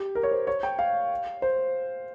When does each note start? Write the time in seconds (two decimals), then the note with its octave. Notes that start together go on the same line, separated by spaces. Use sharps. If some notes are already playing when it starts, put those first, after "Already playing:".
Already playing: G4
0.15 A#4
0.23 C#5
0.31 C5
0.47 C#5
0.63 G5
0.79 F5
1.42 C5